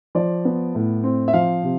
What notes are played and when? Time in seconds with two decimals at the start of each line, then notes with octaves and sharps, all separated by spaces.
0.15 F3 D5
0.45 B3
0.75 A2
1.04 C4
1.28 E5
1.33 F3 F5
1.63 C3